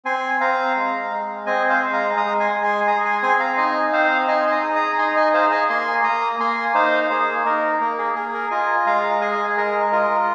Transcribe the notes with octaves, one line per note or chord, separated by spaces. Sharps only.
C4 G#5 C6
C4 F5 A#5
G#3
G#3
C4 D#5 G#5
C5 F5
G#3
F5 A#5
G#3 A#5 D#6
G#5 C6
G#3
G#5 C6
G#4 A#5 D#6
G#5 C6
C4 G#5 C6
F5 A#5
D#4 D#5 G#5
C4 C5 F5
D#4 D#5 G#5
C6
A#5 D#6
G#4
A#5 D#6
D#4 G#5 C6
A#5
D#5 G#5
G#4 C5 F5
D#5 G#5
A#3 G#5 C6
A#3 A#5 D#6
A#3 G#5 C6
D#4 C5 F5
A#3 G#4 C5
D#4 A#4
A#3 A#4
G#4
G#4 A#4
A#4
F4 D#5 G#5
G#3 F5 A#5
G#4 D#5 G#5
G#3 A#4 D#5
F4 A#4 D#5